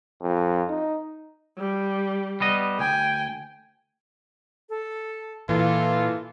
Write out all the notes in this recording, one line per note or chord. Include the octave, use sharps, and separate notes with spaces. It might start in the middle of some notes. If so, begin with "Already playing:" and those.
F2
D#4
G3
G3 B3 D#5
D2 G5 G#5
A4
A#2 E3 F4 A4